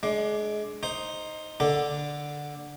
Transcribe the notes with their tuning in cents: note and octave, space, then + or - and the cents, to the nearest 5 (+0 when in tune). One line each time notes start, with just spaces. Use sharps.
G#3 +25 D4 +0
D#4 +0 C5 +10
D3 +0 D4 +0 A4 +0